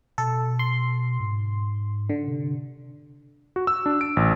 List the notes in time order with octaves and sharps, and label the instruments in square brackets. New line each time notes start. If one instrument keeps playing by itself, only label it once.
[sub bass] B2 [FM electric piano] A4
[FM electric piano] C6
[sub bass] G#2
[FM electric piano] D3
[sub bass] C3
[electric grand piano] F#4
E6
D4
D7
A1